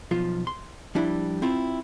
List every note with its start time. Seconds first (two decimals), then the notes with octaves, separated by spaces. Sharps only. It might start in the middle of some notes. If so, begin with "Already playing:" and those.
0.11 B1 F3 F4
0.47 C6
0.95 F3 G3 D4 E4
1.42 C4 E4 F4